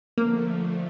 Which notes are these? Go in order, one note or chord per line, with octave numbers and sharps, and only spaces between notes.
D3 F3 A3 A#3